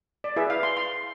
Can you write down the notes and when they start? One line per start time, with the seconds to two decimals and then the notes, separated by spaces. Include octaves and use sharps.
0.24 D5
0.36 E4 G#4 B4 E5
0.50 F5
0.63 C6
0.77 C6